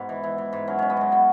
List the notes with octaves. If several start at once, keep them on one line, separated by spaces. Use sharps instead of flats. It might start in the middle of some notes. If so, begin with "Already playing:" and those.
Already playing: G#2 B2 B3
E3
E3
E3
G#2
F#3 C#4
B2 C#4
B3
F#3 G#3
B2 B3